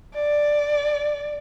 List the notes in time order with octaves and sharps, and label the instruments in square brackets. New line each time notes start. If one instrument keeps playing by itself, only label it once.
[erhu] D5